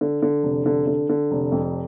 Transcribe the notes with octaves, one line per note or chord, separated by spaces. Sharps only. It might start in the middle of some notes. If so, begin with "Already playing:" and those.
D3
D3
F1
D3
D3
D3
F1
F2